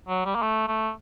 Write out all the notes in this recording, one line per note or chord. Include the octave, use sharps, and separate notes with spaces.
F#3
G3
A#3
A3
A3